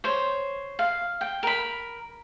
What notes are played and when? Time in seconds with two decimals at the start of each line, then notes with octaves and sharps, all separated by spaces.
0.04 C5 C#5
0.79 F5
1.21 G5
1.43 A#4 B5